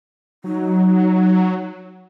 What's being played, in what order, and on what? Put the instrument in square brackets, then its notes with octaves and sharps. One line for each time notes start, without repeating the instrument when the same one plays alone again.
[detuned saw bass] F#3 [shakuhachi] D#4